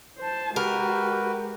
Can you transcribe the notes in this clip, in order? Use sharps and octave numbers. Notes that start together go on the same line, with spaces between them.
C5 A5
G#3 F#4 G4 A#4 B4